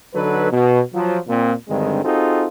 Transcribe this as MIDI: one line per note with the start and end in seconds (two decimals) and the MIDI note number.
0.14 0.47 50
0.14 0.47 54
0.14 0.47 63
0.14 0.47 69
0.14 0.47 71
0.51 0.81 47
0.94 1.17 53
0.94 1.17 54
1.27 1.53 46
1.27 1.53 60
1.68 2.01 43
1.68 2.01 50
1.68 2.01 51
1.68 2.01 56
1.68 2.01 60
2.04 2.47 60
2.04 2.47 63
2.04 2.47 65
2.04 2.47 66
2.04 2.47 68
2.04 2.47 69